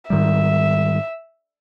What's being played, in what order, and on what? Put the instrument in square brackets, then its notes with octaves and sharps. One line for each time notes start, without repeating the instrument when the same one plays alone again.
[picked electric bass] G#2 D#3 G3 [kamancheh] E5